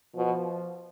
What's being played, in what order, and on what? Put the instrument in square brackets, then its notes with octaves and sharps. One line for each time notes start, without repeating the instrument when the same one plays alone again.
[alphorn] B2 [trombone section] F3